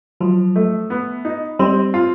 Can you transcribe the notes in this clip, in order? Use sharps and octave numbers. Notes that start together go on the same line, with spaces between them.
F3 F#3
A3
B3
D#4
G3 C4
F4